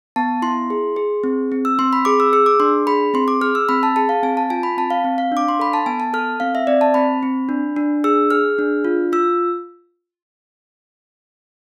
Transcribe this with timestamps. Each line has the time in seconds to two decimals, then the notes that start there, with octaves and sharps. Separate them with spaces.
0.16 B3 A5
0.42 E4 C6
0.70 G#4
0.96 G#4
1.24 C4
1.52 C4
1.65 E6
1.79 C4 C6
1.93 B5
2.05 G#4 D6
2.20 E6
2.33 G#4 E6
2.46 D6
2.60 D4 C6
2.87 G#4 B5
3.14 C4 C6
3.28 D6
3.41 G#4 F6
3.55 E6
3.69 C4 B5
3.83 A5
3.96 G#4 A5
4.09 F5
4.23 C4 G#5
4.37 A5
4.50 F4 G#5
4.63 B5
4.77 C4 A5
4.90 F5
5.04 C4
5.18 F5
5.32 D4 D6
5.49 C6
5.59 A4 B5
5.73 A5
5.86 B3 G#5
6.00 A5
6.13 A4 F6
6.40 C4 F5
6.55 E5
6.67 C4 D5
6.81 A5
6.94 C4 B5
7.23 C4
7.49 D4
7.76 D4
8.04 G#4 E6
8.31 G#4 F6
8.58 D4
8.85 F4
9.12 F4 E6